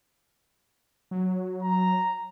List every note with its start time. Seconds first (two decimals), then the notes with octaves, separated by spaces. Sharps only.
1.11 F#3
1.63 A#5